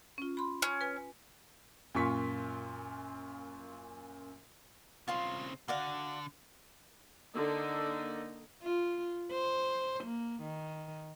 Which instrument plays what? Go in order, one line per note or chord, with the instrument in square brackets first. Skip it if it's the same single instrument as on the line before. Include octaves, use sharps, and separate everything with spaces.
[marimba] C#4 F4
B5 C6
[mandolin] C#4
[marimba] B4 G#5
[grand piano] F#2 A#2 F4 C#6 B6
[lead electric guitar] C#3 C4 [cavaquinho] F4 F5 C6
[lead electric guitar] D3 [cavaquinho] F#4 D5 F5
[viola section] D3 A#3 D#4
[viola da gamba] F4
C5
A#3
D#3